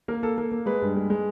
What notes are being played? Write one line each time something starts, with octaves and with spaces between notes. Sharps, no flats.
A#3 A#4
A#3 A4
A#3
A#3
G#3 B4
G2
G#3
G#3